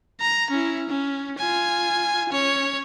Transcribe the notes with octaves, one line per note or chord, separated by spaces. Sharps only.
A#5
C#4 E4
C#4
F4 G#5
C#4 C#5